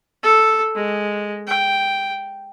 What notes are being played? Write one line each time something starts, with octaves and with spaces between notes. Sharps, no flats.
A4
G#3
G5